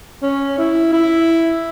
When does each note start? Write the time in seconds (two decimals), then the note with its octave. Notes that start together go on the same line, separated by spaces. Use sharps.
0.22 C#4
0.58 E4
0.93 E4